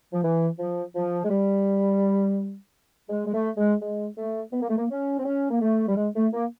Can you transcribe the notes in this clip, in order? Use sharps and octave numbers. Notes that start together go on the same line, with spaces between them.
F3
E3
F3
F3
G#3
G3
G#3
G#3
A3
G#3
G#3
A3
B3
A#3
A3
A#3
C#4
C4
C#4
A#3
A3
G3
G#3
A3
A#3